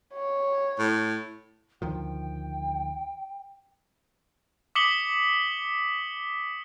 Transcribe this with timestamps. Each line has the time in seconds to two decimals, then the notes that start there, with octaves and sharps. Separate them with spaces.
0.13 C#5
0.79 A2
1.82 D2 D#3 F3 G5
4.75 D6 D#6 B6 C#7 F#7 G7